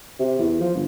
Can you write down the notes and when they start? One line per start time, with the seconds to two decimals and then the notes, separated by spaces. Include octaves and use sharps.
0.19 C3
0.39 E2
0.60 F3
0.75 G1